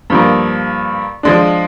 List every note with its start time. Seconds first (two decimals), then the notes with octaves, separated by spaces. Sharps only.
0.10 G2 F3 A#3
1.23 F3 G#3 D4